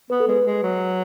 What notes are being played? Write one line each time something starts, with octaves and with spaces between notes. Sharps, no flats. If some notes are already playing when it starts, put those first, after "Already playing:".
B3 B4
A4
G#3 B4
G#3
F#3